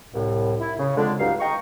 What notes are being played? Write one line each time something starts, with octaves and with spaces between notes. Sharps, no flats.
C2 A2
E4
C#3
F2 D3 G#3 D4
C#2 G2 F#3 G3 D#4 F5
D#5 G5 A#5 C#6